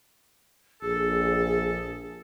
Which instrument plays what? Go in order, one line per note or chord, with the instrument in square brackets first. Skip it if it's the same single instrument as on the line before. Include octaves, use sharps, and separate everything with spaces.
[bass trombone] A#1 [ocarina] G#4 [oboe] A4